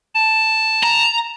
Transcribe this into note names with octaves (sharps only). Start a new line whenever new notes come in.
A5
A#5